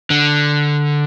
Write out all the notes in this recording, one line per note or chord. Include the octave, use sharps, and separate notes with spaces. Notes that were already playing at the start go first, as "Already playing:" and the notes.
D3